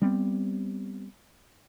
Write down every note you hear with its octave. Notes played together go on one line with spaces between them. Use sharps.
G3 B3 C4